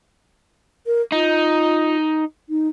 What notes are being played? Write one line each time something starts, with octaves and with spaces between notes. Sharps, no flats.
A#4
D#4 F4
D#4